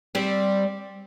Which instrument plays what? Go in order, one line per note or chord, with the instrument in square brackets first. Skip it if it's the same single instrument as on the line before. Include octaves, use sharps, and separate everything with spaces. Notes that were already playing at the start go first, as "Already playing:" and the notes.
[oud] G3 C4